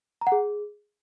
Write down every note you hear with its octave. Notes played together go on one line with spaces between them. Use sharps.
A#5
F#5
G#4